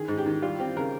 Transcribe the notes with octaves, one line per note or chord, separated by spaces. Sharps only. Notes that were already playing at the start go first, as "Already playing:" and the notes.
Already playing: D#3 G#4
G#2
G4
D#3
G3 F4
C4 G4
C#3 A#4